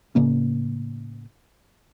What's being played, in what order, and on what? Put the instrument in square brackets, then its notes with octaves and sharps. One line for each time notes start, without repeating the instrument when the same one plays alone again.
[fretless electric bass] A2 C#3 A#3 C#4